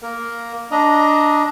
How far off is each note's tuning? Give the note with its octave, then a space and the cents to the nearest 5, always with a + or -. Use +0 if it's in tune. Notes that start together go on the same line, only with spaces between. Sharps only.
A#3 +0 A#4 +0
D4 +0 D#5 +0 A#5 +20